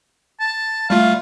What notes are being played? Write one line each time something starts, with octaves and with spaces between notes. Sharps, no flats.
A5
G3 A3 F4 F5